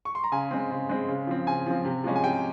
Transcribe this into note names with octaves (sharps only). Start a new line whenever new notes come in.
C#6
C6
A#5
C#3 G#5
G#3 C4
C#3
G#3 C4
C#3
F3 C4
C#3 G#5
F3 C4
C3
F3 G#3 C#4
G#5
C3 G5